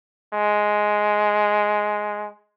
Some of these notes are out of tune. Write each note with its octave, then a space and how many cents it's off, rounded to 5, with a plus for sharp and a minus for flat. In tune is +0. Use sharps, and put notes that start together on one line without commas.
G#3 +5